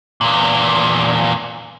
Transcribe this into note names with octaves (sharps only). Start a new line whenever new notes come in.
E2 A#2